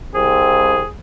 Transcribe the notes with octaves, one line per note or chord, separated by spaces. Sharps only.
C2 C4 G#4